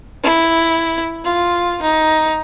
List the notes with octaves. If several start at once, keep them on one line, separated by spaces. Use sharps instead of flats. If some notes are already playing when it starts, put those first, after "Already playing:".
E4
F4
D#4